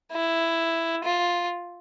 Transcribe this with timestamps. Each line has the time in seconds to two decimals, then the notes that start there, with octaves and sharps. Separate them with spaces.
0.13 E4
1.04 F4